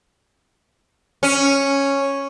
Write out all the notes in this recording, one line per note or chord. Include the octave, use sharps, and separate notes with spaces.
C#4